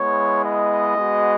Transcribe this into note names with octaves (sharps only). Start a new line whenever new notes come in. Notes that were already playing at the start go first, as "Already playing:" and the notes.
Already playing: G#3 B3 E4 C#5
D#5
G#3 B3 F#4